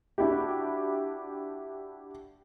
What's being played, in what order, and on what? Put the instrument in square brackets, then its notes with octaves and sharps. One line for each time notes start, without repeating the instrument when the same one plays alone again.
[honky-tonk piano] D4 E4 F#4 G4